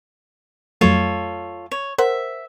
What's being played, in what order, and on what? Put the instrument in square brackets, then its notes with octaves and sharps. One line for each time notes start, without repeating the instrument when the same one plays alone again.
[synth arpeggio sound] F2 F#3 A3 [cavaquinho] F4 A4 C#5
[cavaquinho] C#5
[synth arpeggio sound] A#4 C5 F#5 [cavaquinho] E5